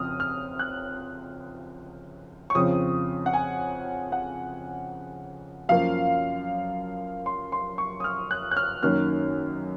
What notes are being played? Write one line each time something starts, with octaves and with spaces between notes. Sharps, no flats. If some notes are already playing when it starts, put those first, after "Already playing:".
Already playing: F2 C#3 C4 D#6 F6
F6
F#6
C#6
F2 C#3 F3 C4 D#6
F#5
G#5
F#5
F#2 F3 A#3 C#4 F5
C6
C6
C#6
D#6
F6
F#6
F#6
F6
F#2 D#3 A#3 C#4 F6